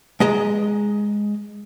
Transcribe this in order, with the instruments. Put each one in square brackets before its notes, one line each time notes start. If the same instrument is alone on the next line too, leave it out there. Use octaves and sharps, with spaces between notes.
[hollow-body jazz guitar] G#3 D#5 A#5